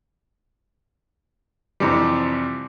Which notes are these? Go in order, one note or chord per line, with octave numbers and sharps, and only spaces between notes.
F2 C3 E3 G3